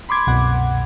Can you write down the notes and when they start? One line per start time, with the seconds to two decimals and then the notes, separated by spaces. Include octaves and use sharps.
0.09 B5 C6 D6 G#6
0.27 C2 F#2 B2 F#5